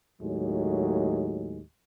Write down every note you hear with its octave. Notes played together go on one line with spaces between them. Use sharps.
D#2 A2 F#3 G#3